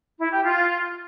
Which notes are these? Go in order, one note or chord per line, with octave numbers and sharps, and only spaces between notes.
E4
G4
F4